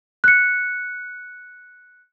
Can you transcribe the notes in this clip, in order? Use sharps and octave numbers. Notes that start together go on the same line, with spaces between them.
F#6 C#7